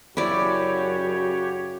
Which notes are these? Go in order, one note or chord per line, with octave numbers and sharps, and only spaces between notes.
F#2 C#3 E4 F#4 G4 C#5 D5